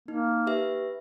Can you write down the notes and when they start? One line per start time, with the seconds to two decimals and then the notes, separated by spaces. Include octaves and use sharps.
0.08 A#3 D#4
0.47 G4 B4 E5